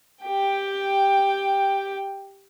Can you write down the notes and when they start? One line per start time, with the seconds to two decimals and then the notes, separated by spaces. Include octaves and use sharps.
0.23 G4 G5